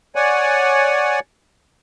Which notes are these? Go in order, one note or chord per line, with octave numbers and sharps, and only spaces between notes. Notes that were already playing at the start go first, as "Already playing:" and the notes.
C#5 D5 F#5 G#5